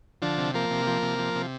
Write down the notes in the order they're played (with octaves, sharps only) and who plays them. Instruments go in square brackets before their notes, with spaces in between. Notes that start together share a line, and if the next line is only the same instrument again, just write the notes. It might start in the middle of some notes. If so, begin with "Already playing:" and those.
[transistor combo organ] D3 F3 D4
C3
F3 A#3 A#4
C3
F3
C3
F3
C3